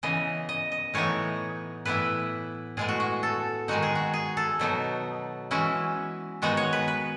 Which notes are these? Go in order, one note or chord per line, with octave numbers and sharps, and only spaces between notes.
C#3 E3 B3 D#5
D#5
D#5
A2 E3 B3 D#4 C#5
A2 E3 B3 E4 B4
A2 G#3 B3 G#4
F#4
F#4
A4
D#3 G#3 D#4 F#4
G#4
F#4
G#4
A4
B2 F#3 B3 D#4
E3 G#3 C#4 E4 F#4
D#3 G#3 B3 D#4 F#4
C#5
B4
B4